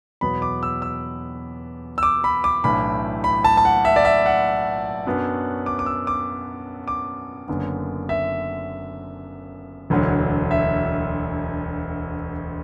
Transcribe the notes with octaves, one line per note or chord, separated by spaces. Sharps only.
E2 B2 F#3 B3 B5
D6
E6
E6
E6
D6
B5
D6
B1 A2 E3 D4 B5
B5
A5
A5
F#5
E5
D5
E5
F#5
F#2 F#3 B3 D4
D6
D6
E6
D6
D6
F#1 F#2 D3 B3
E5
E1 D2 D3 F#3
E5